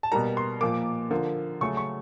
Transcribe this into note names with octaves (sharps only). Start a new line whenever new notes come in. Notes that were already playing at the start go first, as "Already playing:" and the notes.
A5
B2 G3 A#3 A#5
C6
A#2 F3 A#3 D6
D3 F3 A#3
C#3 F#3 A3 C#6
C#6